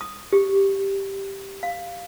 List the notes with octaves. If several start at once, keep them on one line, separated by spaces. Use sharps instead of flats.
D#6
G4
F5